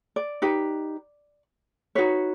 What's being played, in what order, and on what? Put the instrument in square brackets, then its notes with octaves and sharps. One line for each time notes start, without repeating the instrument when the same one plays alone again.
[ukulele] D5
D#4 G4 B4
D#4 F#4 B4 C#5